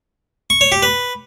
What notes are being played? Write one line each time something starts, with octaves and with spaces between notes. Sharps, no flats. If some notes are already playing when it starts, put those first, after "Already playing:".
C#6
C#5
G4
B4